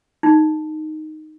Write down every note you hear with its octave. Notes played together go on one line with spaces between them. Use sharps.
D#4